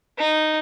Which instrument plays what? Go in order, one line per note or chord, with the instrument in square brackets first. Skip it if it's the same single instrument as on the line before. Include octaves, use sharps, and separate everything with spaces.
[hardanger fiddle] D#4